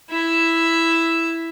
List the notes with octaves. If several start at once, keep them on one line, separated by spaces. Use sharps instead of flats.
E4 E5